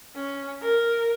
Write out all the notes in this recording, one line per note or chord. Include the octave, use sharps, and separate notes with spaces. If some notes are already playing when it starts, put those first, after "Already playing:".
C#4
A#4